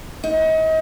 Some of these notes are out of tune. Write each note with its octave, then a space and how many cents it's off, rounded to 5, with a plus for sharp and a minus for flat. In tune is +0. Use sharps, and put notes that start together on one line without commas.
D#4 +35